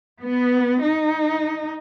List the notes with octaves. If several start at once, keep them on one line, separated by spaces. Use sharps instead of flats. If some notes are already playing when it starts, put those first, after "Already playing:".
B3
D#4